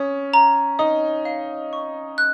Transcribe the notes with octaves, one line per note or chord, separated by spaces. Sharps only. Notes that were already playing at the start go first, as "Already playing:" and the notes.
Already playing: C#4 D#6
A#5
D#4 D#6
F5
C#6
F#6